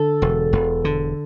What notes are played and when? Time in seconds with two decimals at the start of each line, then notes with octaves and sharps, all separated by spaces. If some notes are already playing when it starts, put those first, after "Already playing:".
Already playing: D3 A4
0.22 E1
0.53 E1
0.85 D3